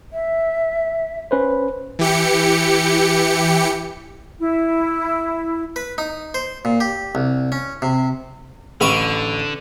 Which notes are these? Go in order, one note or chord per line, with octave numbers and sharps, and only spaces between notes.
E5
C#4 B4 C5
E3 G4 C#7
E4
B4
D#4
C5
A#2
G4
C2
C#4
C3
A1 D3 B5 C#6